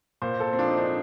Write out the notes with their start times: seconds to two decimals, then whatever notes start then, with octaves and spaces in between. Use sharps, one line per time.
0.22 A#2 C5
0.40 A4
0.53 C4
0.59 F3 D4
0.68 D#4
0.78 D4